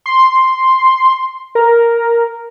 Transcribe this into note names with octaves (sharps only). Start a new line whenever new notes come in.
C6
A#4